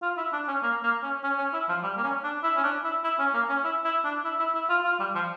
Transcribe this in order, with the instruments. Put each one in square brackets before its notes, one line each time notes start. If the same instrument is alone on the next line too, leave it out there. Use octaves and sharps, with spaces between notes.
[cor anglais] F4
E4
D4
C#4
A#3
A#3
C#4
C#4
C#4
E4
F3
G3
A#3
C#4
D4
E4
C#4
D4
E4
E4
C#4
A#3
C#4
E4
E4
D4
E4
E4
E4
F4
F4
G3
F3